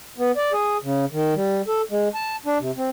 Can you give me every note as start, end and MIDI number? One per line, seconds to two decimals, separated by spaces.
0.18 0.32 59
0.36 0.52 74
0.52 0.77 68
0.82 1.05 49
1.12 1.34 51
1.35 1.62 55
1.68 1.82 69
1.90 2.08 56
2.14 2.36 81
2.46 2.58 62
2.59 2.71 48
2.77 2.90 60